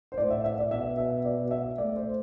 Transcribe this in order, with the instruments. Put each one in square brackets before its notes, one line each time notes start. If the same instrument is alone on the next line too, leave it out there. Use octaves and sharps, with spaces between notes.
[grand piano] C5
[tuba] A2 [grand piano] D5
[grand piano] E5
E5
D5
[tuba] B2 [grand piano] E5
[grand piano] E5
D5
E5
[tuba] A3 [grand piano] D5
[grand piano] C5